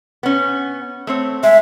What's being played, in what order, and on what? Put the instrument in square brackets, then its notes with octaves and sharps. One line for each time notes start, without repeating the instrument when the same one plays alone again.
[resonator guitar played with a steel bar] B3 C#4
A3 C4 C#5
[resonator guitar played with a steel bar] G#3 [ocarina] E5